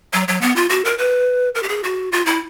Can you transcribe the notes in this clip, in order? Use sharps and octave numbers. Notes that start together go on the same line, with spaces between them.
F#3
F#3
B3
F4
F#4
A#4
B4
A#4
G4
G#4
F#4
F4
E4